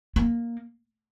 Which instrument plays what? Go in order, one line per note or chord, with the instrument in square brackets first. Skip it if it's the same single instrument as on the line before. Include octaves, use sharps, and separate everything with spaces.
[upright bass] A#3